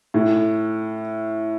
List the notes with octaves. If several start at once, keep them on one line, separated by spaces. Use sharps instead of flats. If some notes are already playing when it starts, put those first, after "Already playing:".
A2